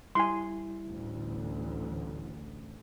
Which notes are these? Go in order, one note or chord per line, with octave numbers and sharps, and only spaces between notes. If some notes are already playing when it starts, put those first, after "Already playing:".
G3 E4 G#5 C6
A1 D2